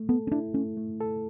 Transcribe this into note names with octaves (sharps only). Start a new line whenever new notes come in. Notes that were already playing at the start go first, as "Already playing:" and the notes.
Already playing: A3
B3 A4
C#4
D4 E4
A3 C#4
A3
A4